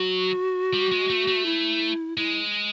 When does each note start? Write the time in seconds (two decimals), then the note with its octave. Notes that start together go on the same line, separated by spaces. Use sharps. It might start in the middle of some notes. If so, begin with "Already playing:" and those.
Already playing: F#3 F#4
0.73 G3
0.92 G#3
1.10 A3
1.28 A3
1.46 E4
2.17 G#3 E4